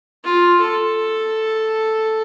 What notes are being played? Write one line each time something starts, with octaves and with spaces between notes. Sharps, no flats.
F4
A4